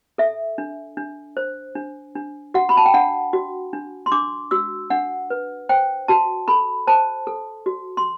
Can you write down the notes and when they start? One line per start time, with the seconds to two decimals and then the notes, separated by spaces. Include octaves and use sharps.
0.18 A4 E5
0.58 D4
0.97 D4
1.37 C5
1.75 D4
2.15 D4
2.54 F#4 F#5
2.69 B5
2.77 A5
2.86 G5
2.94 D4 F#5
3.33 F#4
3.73 D4
4.06 C6
4.12 D4 D6
4.51 F#4 E6
4.90 D4 F#5
5.30 B4
5.69 C5 G5
6.08 F#4 A5
6.48 A4 B5
6.87 C5 A5
7.27 A4
7.66 F#4
7.97 C6